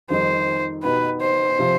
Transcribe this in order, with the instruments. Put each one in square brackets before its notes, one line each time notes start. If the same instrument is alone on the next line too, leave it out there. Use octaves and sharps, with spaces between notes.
[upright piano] F2 D#3 G3 C4 D#4 [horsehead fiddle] C5
[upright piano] B2 B3 D#4 G4 [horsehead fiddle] B4
[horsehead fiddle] C5
[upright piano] C3 F3